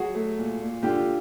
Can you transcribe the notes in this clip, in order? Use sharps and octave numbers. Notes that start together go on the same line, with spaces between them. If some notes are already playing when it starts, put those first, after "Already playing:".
Already playing: F#3 F#4 G#4
A3
A#2
A#2
D3 F4 G4